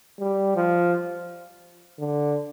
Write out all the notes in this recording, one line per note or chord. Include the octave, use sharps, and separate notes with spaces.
G3
F3
D3